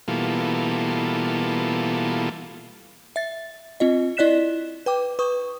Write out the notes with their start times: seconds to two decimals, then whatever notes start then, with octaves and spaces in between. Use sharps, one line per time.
0.08 B2 E3 G3 A#3 F4 A4
3.16 E5 A6
3.80 C4 F4 D#5
4.17 E4 D5 D#5 F#6 B6 E7
4.86 B4 G5 D6
5.19 B4 C#6 D#6